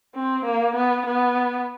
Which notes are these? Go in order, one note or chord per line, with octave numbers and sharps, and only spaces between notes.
C4
A#3
B3
B3